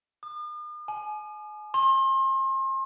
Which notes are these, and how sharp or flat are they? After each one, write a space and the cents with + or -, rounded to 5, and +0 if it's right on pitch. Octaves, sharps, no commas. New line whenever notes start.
D#6 -45
G#5 +35
C6 +35